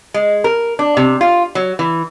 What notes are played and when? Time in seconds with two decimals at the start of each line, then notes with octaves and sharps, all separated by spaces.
0.14 G#3
0.44 A#4
0.79 D4
0.97 C3
1.21 F4
1.55 F#3
1.79 E3